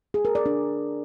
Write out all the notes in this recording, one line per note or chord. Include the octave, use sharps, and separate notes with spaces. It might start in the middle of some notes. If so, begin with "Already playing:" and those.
G#4
A#4
D5
D4